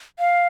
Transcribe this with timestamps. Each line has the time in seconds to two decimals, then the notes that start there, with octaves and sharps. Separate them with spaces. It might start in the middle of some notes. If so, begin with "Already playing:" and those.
0.19 F5